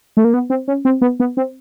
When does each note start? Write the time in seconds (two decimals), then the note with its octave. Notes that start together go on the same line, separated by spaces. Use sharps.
0.17 A3
0.24 A#3
0.34 B3
0.50 C4
0.68 C#4
0.85 C4
1.01 B3
1.20 B3
1.37 C4